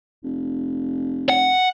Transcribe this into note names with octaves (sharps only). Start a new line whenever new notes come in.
F1
F#5